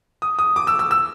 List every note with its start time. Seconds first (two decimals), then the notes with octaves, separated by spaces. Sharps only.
0.22 D#6
0.39 D#6
0.56 D6
0.67 E6
0.79 E6
0.91 E6